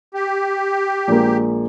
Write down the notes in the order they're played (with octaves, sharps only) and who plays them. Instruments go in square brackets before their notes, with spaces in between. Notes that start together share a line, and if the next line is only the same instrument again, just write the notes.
[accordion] G4
[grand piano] A#1 G#3 A#3